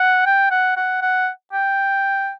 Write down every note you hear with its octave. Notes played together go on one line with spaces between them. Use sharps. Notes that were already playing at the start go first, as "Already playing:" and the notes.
Already playing: F#5
G5
F#5
F#5
F#5
G5